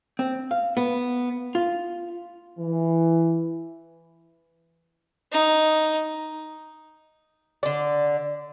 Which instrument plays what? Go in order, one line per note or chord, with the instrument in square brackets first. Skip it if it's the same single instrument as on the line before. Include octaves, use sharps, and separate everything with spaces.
[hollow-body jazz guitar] C4
F5
B3
F4
[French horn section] E3
[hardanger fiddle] D#4
[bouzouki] D3 D5